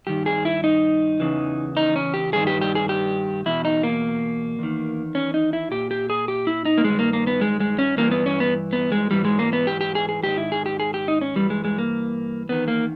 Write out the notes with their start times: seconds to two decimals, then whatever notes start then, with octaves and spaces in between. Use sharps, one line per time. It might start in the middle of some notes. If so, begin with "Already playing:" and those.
0.07 G2 D#3 G4
0.26 G#4
0.45 E4
0.64 D#4
1.20 E2 C#3 E3
1.77 D#4
1.96 C#4
2.14 G4
2.33 G2 D#3 G#4
2.47 G4
2.61 G4
2.75 G#4
2.89 G4
3.46 E2 B2 E4
3.65 D#4
3.83 A#3
4.59 E2 D#3
5.15 C#4
5.34 D#4
5.53 E4
5.71 A#2 G4
5.91 G4
6.10 G#4
6.28 G4
6.47 E4
6.65 D#4
6.78 A#3
6.84 G2 D#3 G#3
6.99 A#3
7.13 A#3
7.27 B3
7.41 G#3
7.60 G#3
7.79 C#4
7.97 G2 E3 A#3
8.11 B3
8.26 C#4
8.40 B3
8.73 B3
8.92 G#3
9.11 G#2 E3 G3
9.25 G#3
9.39 A#3
9.53 B3
9.67 G4
9.81 G4
9.95 G#4
10.09 G#4
10.23 G#2 D#3 G4
10.38 E4
10.52 G#4
10.66 G4
10.80 G#4
10.94 G4
11.08 D#4
11.21 C#4
11.36 G2 E3 G3
11.50 G#3
11.65 G#3
11.78 A#3
12.49 E2 D#3 B3
12.68 A#3